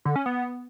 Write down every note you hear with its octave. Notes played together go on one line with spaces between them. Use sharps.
D3
C#4
B3